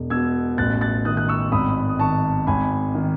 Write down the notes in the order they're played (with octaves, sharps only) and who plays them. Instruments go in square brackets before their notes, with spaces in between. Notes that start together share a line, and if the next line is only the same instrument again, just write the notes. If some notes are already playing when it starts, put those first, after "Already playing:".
Already playing: [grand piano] E1
B2 E6 G#6
A1 F#6 A6
F#6 A6
D#3 D#6 F#6
F#6
C#6 E6
G#1 B5 D#6
D#6
D#3 A5 C#6
G#1 G#5 B5
D#3